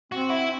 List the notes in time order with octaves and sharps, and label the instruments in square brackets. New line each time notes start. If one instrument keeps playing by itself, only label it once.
[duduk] C4 [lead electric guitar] F#4
[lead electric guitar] E4